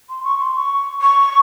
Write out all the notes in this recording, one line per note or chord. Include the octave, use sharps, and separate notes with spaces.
C6
C#6
C6
C#6
C#6